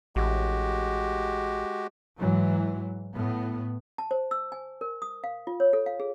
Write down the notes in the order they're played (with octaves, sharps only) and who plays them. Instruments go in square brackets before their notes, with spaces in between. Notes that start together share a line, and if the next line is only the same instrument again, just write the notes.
[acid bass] A1 [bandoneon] G#3 F#4 G4
[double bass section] G#2 E3 F#3
A2 B3
[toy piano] A5
C5
E6
G#5
A#4
D#6
F5
F4
C#5
A4
F5
G#4